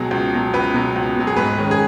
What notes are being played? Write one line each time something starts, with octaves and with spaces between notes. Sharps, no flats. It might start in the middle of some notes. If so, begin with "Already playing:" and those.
Already playing: C#2 B2 F#3 G#4
C#2
B2 F#3
C#2 B4
B2 F#3
C#2
B2 F#3
G#4
G#2 B4
D#3 G#3 C#4
G#4